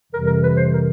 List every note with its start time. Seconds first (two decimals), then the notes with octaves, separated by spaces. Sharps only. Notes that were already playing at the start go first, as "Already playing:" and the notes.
0.11 F2 C3 E3 G3 A#4
0.26 A#4
0.42 B4
0.56 C5
0.72 A#4